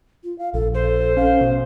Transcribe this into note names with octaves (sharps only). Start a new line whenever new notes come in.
F4
F5
A#1 A4
A4 C5
C#4 F5
B2